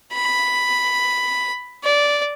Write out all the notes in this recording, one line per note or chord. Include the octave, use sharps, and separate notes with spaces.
B5
D5